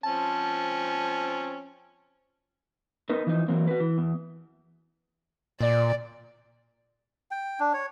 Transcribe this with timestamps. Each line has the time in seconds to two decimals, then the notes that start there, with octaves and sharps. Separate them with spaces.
0.04 F3 C4 C#4 A5
3.10 B3 D#4 A#4 B4
3.27 E3 F3 D#4
3.48 E3 F#3 A#3 C4
3.67 F#4 B4
3.80 E3
3.98 E2
5.61 A#2 D5
7.31 G5
7.60 D4
7.73 C#5